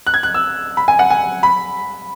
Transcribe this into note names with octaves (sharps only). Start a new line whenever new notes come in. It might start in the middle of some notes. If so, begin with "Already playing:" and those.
F#6
G#6
F#6
E6
B5
G#5
F#5
G#5
B5